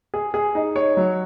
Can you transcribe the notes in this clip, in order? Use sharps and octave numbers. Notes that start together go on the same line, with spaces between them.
G#4
G#4
D#4
C#5
F#3